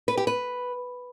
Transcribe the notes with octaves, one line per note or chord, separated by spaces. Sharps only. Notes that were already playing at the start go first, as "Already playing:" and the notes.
B4
G4
B4